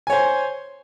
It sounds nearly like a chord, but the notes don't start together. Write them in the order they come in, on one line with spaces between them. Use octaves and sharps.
G#5 C#5 C5